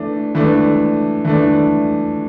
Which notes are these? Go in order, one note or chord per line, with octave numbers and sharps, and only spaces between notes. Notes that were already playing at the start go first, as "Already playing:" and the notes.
Already playing: E3 A3 D4
E3 A3 D4
E3 A3 D4